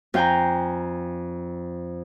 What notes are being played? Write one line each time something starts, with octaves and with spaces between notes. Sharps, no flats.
F2 F5 G5 G#5 A#5